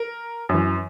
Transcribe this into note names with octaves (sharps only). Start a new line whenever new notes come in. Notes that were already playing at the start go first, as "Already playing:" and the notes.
Already playing: A#4
F#2 E3